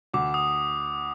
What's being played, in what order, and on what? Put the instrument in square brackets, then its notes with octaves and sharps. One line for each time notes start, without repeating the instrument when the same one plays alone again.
[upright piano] D2 [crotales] D6
[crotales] D#6